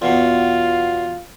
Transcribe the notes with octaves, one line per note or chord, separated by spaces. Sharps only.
E2 B2 F4